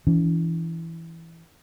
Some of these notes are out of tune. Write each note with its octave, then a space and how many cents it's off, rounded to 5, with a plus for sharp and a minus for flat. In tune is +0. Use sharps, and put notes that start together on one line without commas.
E3 +0 C#4 +45